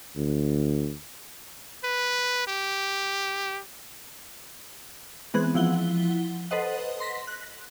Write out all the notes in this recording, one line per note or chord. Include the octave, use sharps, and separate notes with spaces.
D2
B4
G4
E3 G#3 B3 C4 G#4 F#6
F3 E4 F#5 G7
A4 B4 C5 D#5 F#5
C6 A#6 B6
F#6